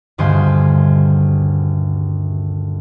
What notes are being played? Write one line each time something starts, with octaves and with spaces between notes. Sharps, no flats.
D#1 D2 G2 C5 D#5 G#5